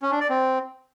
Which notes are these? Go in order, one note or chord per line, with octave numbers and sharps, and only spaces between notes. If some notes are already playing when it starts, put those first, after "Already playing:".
C#4
D4
D5
C4